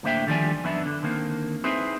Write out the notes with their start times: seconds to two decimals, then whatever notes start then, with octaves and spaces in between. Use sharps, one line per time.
0.03 A2 D3 A#3 C5 E5 G5
0.27 D3 D#3 F3 G3 D5 G#5
0.64 F#2 E3 B3 D4 E4
0.86 D3
1.02 D3 D#3 A#3 C4
1.64 C4 D#4 E4 G#4 B4 C5